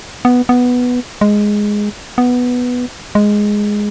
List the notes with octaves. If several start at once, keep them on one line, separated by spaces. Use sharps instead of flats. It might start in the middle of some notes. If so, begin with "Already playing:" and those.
B3
B3
G#3
B3
G#3